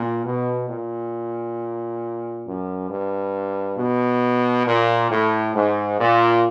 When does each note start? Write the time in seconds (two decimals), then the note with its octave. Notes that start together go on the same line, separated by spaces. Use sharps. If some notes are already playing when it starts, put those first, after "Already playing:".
Already playing: A#2
0.24 B2
0.69 A#2
2.45 F#2
2.90 G2
3.77 B2
4.66 A#2
5.10 A2
5.54 G#2
5.99 A#2